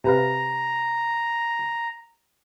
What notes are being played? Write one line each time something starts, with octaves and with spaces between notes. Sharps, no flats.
C3 B4 F5 A#5